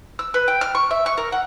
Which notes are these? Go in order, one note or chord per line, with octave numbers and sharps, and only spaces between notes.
E6
B4
G5
F6
C#6
E5
C#6
A#4
F#5